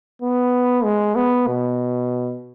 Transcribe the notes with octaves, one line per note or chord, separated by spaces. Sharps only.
B3
G#3
B3
B2